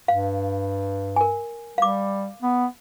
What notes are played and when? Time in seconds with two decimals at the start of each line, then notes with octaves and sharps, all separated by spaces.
0.08 G2 F5
1.16 A#4 G#5
1.78 G3 F5 D6
2.42 B3